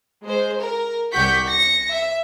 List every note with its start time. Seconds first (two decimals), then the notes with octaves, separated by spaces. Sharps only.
0.25 G#3 C5
0.57 A#4
1.12 C2 G4 F#5 C#6 G6 B6
1.47 A#6 C#7
1.89 E5